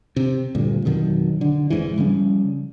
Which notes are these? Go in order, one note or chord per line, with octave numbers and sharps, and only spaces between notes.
C3
D2 G2 A#2
F2 B2 D#3 F#3
D3
F1 G#2 E3
C#3 F3 G3 C#4